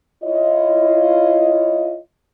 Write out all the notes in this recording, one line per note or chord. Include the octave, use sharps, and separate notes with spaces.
E4 F4 C#5 D#5